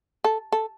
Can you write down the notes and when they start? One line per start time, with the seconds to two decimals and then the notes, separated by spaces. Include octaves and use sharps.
0.24 A4
0.52 A4